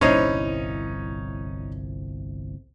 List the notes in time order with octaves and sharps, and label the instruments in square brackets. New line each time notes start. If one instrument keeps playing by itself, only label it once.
[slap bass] G1 C2 F2 [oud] A#2 E4 C5 [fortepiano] C#4 D#4